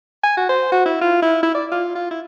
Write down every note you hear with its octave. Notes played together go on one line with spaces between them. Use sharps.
G#5
F#4
C5
F#4
E4
F4
E4
E4
D5
F4
F4
E4